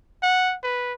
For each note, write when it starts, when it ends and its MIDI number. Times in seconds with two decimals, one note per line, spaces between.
0.23 0.55 78
0.64 0.93 71